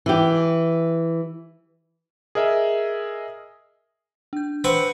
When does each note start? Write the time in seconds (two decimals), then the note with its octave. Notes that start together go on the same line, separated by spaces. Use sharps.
0.06 E3 G4
2.35 G#4 A#4 D#5 E5
4.33 D4 G6
4.64 C4 B4 F#5 C#6